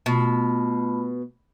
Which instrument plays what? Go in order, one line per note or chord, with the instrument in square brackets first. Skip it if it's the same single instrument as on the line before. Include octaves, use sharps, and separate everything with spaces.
[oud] B2 [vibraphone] A3 F4 B5